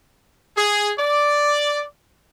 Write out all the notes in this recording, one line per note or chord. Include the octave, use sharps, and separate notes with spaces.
G#4
D5